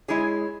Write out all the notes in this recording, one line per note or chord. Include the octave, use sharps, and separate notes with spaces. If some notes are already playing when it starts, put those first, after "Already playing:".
G#3 E4 G#4 C#5